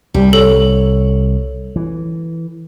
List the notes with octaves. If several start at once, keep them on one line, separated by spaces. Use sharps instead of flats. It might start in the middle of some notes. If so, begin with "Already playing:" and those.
C2 G3
A4 C#5
E3